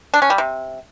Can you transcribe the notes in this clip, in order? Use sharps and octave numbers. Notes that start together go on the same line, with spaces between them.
D4
C#4
G3
C3